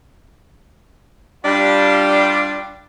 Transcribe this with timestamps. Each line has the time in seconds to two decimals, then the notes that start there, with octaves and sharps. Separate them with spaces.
1.44 G3 D4 F4